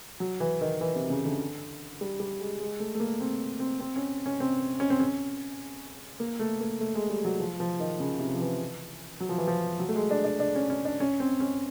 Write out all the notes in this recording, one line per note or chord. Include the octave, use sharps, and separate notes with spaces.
F#3
E3
D#3
E3
C3
C#3
D3
G3
G3
G#3
G#3
A3
A3
A#3
C4
C4
C4
C#4
C#4
C4
C#4
C4
C#4
A#3
A3
A#3
A3
G#3
G3
F#3
F3
F3
D#3
C#3
C3
F3
E3
F#3
F3
E3
F3
F#3
A3
G#3
D4
D4
D4
C#4
C#4
D4
C#4
C4
C#4